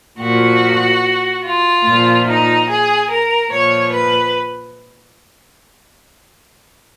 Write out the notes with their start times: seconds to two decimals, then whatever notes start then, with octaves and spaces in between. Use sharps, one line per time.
0.20 A#2 F3 F#4
1.44 F4
1.86 A#2 F3
2.27 D#4
2.68 G#4
3.09 A#4
3.51 A#2 F3 C#5
3.92 B4